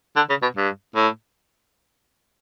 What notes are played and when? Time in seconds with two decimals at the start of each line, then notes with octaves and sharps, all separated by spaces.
0.17 D3
0.30 C#3
0.42 B2
0.57 G2
0.96 A2